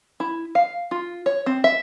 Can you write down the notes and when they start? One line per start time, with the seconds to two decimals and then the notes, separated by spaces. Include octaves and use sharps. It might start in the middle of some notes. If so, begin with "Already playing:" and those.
0.20 E4
0.55 F5
0.91 F4
1.26 C#5
1.46 C4
1.64 E5